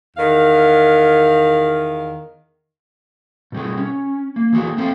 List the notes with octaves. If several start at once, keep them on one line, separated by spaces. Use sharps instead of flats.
E2 D#3 F5
B2 G3 G#4
C#4
A#3
E3 A#3 F#4 G#4
A3 C4 F5